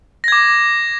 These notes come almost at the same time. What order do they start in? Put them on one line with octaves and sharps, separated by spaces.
A#6 G#6 D6